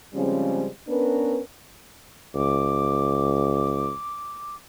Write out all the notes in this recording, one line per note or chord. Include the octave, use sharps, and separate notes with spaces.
C#3 F3 G3 G#3 C4 C#4
B3 C#4 D4 A#4 B4
C#2 D6